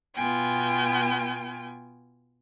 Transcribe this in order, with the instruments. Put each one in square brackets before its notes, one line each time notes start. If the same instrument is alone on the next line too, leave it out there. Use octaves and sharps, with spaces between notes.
[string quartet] B2 B3 F4 G5 G#5